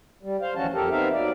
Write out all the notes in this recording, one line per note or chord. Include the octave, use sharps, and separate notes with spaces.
G3
C5 F5
D2 E3 F3 C#4 F#4 A5
F2 G4 A4 A#4
B3 C4 D#4 A#4 E5 F5
F#3 D5